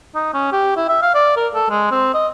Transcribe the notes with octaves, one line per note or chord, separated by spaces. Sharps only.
D#4
C#4
G4
E4
E5
F5
D5
A#4
A4
G#3
C4
D#5